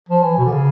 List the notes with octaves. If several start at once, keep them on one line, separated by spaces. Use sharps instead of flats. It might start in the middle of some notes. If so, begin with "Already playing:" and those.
F3
E3
B2
D3
C#3